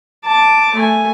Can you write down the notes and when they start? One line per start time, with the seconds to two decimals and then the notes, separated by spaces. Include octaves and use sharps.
0.25 A5 D6
0.75 A3 G#5